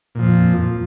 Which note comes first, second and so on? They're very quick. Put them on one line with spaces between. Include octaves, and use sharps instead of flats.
A#2 F3 F2